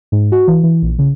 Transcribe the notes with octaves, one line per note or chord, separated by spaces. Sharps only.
G#2
F#4
E3
E3
A#1
C#3